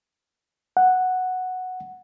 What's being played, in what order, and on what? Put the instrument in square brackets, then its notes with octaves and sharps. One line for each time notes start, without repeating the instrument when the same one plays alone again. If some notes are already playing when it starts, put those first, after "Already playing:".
[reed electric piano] F#5